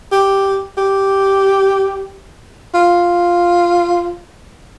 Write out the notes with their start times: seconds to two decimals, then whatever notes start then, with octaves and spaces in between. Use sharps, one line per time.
0.12 G4
0.77 G4
2.74 F4